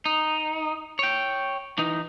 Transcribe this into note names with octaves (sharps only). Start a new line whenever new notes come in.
D#4
C#5 G5
E3 D#4